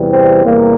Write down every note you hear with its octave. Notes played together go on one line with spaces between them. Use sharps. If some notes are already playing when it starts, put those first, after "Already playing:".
Already playing: E2 C3 E3 G3
C4
E2 C3 G3 A#3